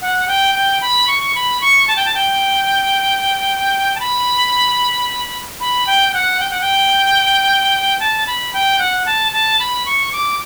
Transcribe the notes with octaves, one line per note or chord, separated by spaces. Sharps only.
F#5
G5
G5
B5
C#6
B5
C#6
A5
G5
A5
G5
A5
B5
B5
G5
G5
F#5
G5
F#5
G5
A5
B5
G5
F#5
A5
A5
B5
C#6
D6